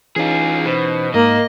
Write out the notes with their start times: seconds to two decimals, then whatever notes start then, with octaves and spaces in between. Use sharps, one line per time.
0.16 E3 C#4 D#4 F4 G#4
0.66 B2 C5
1.14 G#2 A#3 A#4 D#5